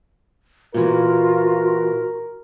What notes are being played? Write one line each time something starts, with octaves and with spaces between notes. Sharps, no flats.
A#2 E3 F4 F#4 A#4